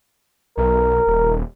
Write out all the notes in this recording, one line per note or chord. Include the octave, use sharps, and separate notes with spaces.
B1 A#4
D#1